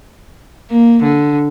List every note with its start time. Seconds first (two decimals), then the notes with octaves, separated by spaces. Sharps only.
0.71 A#3
1.03 D3